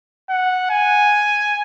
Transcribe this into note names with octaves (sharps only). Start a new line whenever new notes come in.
F#5
G#5